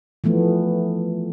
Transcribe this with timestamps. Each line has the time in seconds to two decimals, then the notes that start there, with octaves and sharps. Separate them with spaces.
0.24 E3 F3 A3 B3